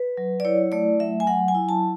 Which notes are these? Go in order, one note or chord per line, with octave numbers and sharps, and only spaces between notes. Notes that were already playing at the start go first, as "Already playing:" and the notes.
Already playing: B4
F#3
D5
E4 C#5
A3 D5
F#3 E5
G#5
F#3 F#5
G#5
E4
A5